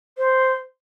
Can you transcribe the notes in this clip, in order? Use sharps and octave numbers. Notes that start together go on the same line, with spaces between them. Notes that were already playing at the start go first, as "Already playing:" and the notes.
C5